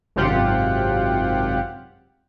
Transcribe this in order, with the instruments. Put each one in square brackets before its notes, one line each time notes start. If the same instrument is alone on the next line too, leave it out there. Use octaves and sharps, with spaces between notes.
[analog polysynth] G#1 F#2 C3 F4 G4 F#5